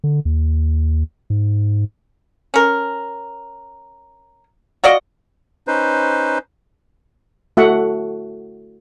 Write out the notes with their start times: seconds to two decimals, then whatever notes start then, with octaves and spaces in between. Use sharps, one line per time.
0.04 D3
0.25 D#2
1.30 G#2
2.54 C#4 A#4
4.84 F4 F#4 D5 D#5
5.67 C#4 D#4 B4 C5
7.57 A3 F#4 E5 F#5